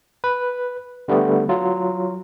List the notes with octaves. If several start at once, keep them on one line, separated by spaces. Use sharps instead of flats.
B4
D3 G3 A3 B3
F#3 F4